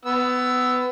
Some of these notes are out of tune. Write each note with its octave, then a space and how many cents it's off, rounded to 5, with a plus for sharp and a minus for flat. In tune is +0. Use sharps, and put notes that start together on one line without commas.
B3 +20 E6 +0